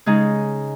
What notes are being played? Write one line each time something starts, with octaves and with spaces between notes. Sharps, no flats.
C#3 G#3 D#4 G#4